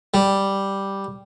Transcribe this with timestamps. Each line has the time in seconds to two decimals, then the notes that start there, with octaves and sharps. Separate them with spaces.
0.14 G3